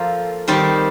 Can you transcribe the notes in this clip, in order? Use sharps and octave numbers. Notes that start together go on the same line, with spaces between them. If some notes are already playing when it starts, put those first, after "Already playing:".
Already playing: F3 A#3 F4 A4
D#3 G3 C4 G4